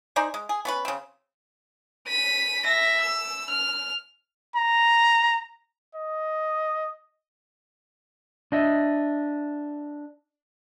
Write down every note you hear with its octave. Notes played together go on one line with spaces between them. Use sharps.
D#4 C5 D5 G#5
G#3
G#4
B3 C#4 B4
C#3 C4
B6 D#7
E5 A#6
E6
F6
A#5
D#5
D4 D#5 E5